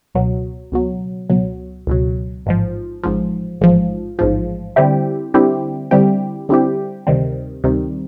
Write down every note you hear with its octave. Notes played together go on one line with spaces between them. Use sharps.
C#2 B2 F#3
C#2 B2 F#3
C#2 B2 F#3
C#2 B2 F#3
A1 G#2 F3
A1 G#2 F3
A1 G#2 F3
A1 G#2 F3
D3 G3 C4 E4 G4
D3 G3 C4 E4 G4
D3 G3 C4 E4 G4
D3 G3 C4 E4 G4
D2 C3 D#3 G3 C4
D2 C3 D#3 G3 C4